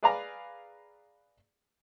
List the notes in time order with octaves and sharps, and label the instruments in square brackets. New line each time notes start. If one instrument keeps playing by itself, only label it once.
[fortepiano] G#4 B4 D5 F5 G#5 A#5